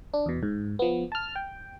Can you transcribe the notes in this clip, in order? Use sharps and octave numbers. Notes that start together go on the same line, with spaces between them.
D4
E2 B2
G#2
F3 B3
A5 F6
G5